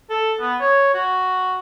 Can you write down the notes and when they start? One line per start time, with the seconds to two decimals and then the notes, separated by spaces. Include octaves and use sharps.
0.10 A4
0.40 B3
0.60 C#5
0.94 F#4